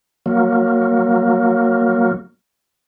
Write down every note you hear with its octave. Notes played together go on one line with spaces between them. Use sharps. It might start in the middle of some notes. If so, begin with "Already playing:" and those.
F#3 A#3